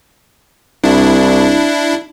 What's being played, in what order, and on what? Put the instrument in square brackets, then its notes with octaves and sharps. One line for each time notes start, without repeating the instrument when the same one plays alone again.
[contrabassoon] C2 [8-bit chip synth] D4 E4